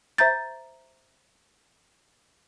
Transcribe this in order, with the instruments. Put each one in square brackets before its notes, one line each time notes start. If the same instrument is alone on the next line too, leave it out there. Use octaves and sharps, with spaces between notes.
[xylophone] C5 E5 A#5 G6 A6